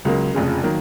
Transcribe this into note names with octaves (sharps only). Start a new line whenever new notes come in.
C#2 C#3 F#3 A#3
F1 F2 C#3 G#3
D#3 F#3 A#3